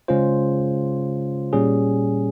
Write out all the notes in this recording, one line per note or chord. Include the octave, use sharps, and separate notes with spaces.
C#3 G#3 C#4 F4 C5
A#2 G3 C#4 G#4